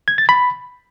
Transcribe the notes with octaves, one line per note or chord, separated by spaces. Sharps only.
G#6
A6
B5